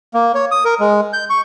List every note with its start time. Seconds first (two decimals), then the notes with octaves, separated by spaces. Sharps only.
0.14 A#3
0.35 C#5
0.51 D#6
0.65 A#4
0.80 G#3
1.13 G6
1.30 C#6